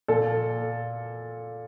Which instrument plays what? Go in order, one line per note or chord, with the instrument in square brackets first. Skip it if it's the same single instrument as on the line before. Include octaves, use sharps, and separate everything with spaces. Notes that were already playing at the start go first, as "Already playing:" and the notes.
[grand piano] A#2 A4